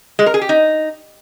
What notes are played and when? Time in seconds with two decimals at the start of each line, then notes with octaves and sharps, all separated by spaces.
0.19 G#3
0.26 A#4
0.34 G#4
0.41 G4
0.49 D#4